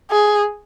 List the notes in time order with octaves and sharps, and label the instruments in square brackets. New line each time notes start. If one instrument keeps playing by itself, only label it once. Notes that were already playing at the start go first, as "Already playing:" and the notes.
[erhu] G#4